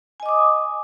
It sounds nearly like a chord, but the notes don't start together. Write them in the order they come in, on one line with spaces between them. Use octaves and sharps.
G#5 D#5 D6 D#6